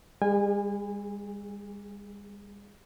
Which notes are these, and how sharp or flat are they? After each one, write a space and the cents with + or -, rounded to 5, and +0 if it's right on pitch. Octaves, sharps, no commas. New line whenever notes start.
G3 +45 G#4 +0 G#5 -25